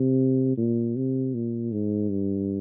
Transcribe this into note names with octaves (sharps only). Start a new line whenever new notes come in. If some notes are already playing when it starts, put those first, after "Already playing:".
Already playing: C3
A#2
C3
A#2
G#2
G2